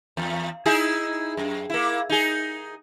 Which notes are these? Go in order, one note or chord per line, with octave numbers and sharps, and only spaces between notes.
E2
D#4 E4 G#4
F#2
A#3 E4
D#4 G#4